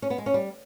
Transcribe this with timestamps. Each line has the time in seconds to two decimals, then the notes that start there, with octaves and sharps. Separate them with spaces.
0.02 C#4
0.10 B3
0.18 G#3
0.26 C#4
0.34 G3